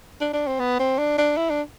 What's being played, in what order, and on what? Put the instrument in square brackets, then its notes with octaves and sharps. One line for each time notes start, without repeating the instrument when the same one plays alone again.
[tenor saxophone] D4
D4
C4
B3
C4
D4
D4
E4
D4